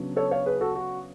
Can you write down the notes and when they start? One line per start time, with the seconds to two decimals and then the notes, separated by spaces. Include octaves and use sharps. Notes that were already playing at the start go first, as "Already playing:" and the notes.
Already playing: C#3 F#3 B3 D4
0.16 A4 C#5
0.31 C#5 F5
0.46 G#4 B4
0.61 F#4 A4
0.76 F#4